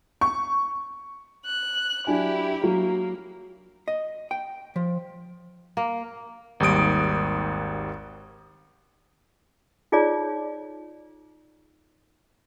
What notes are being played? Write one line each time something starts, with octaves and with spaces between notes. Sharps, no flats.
C#6
F#6
F#3 D4 E4 G4 G#5
F#3 A#3
D#5
G5
F3
A#3
G#1 D#2 G3 D#6 D7
D#4 F4 G#4 C#5 D5